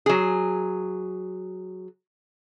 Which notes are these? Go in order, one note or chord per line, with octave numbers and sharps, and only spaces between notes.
F#3 G#4